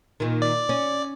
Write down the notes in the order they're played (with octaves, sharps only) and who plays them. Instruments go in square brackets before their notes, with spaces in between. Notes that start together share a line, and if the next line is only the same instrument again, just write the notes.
[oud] A#2 D#3
[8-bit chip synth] D5
[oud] C#4